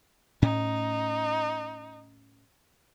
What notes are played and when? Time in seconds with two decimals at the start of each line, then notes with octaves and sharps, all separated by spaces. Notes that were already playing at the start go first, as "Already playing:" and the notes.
0.42 A2 C#4 D#4